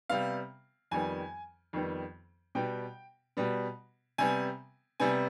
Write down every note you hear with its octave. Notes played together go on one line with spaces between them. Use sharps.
C3 G3 B3 F5
F2 D#3 G3 B3 G#5
F2 D#3 G3 B3
B2 G3 B3 G5
B2 G3 B3
C3 G3 B3 G#5
C3 G3 B3 G#5